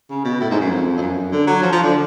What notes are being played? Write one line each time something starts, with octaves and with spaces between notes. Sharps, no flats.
C#3
B2
A2
G#2
F#2
F2
F2
F#2
D3
F#3
F3
F3
D3